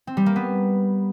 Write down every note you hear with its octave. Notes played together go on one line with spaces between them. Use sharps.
C4
G3
A#3
B3